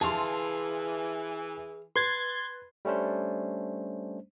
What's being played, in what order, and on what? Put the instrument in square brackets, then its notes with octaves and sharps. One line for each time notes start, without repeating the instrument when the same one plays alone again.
[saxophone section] E3 [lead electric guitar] G#4 F5 [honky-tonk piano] A5 C6
[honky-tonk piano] B4 [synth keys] C6 G#6 A6
[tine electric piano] G3 A3 C#4 D4 C5